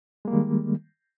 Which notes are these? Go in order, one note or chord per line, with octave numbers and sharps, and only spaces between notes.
D#3 G3 G#3 A#3